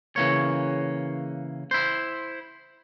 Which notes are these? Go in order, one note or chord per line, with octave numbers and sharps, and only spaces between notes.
C#3 E3 A#3 C#5
E4 C5